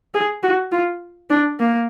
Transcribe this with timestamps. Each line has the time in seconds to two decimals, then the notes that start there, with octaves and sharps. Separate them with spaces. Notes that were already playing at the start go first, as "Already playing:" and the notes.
0.14 G#4
0.43 F#4
0.72 F4
1.30 D4
1.59 A#3